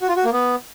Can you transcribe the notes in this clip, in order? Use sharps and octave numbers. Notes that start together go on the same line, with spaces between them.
F#4
F4
F#4
A#3
B3